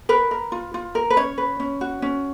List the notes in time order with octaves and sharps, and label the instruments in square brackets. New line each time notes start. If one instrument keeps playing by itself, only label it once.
[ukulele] A#4 B4
A#4
F4
F4
A#4
B4
C#4 C#5
B4
C#4
F#4
C#4